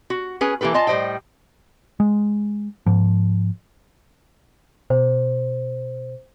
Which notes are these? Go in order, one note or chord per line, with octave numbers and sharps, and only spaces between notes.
F#4
C#4 G#4 B4 G#5
E3 A#3 G4 A4 B4
F4 D#5 G#5 A5
A2 G3 C5 D#5 G5
G#3
G#2 F3
B2 C5